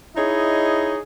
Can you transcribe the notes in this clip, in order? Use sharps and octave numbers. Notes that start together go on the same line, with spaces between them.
D#4 E4 G#4 C#5 D#5